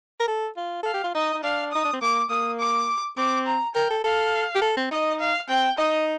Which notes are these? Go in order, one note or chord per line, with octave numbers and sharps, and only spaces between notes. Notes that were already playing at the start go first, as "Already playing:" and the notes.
A#4
A4
F4
A4 F5
G4
F4
D#4 D#5
D#4
D4 F5
D#4 D#6
D4
C4
A#3 D6
A#3 D#6
D6
C4 D6
A#5
A#4 G5
A4
A4 F5
G4
A4
C4
D#4 D#5
F5
C4 G5
D#4 D#5